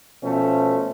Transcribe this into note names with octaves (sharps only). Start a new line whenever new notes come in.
B2 F3 A3 C#4